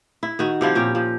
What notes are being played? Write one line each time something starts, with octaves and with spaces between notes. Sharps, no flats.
E4
D#3 F#4
C3 F3 E4 F4
A#2 C#4 G5
F3